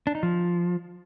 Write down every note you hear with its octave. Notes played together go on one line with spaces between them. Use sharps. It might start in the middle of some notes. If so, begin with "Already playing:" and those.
D4
D#4
F3